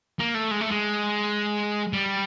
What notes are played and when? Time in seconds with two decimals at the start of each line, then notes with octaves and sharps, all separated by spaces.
0.19 A#3
0.34 A3
0.51 G#3
0.61 A3
0.71 G#3
1.93 G3